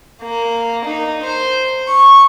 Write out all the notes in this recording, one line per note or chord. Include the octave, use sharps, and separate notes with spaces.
A#3
D#4
C5
C#6